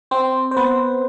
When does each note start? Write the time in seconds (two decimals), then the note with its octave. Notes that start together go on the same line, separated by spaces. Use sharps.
0.11 C4 C5
0.51 C5
0.57 B3 B4